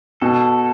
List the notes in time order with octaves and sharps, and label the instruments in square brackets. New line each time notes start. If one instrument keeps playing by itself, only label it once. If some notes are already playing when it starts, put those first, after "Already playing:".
[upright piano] B2 [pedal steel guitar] A4